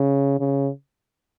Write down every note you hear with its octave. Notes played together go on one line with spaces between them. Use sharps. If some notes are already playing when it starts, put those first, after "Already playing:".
Already playing: C#3
C#3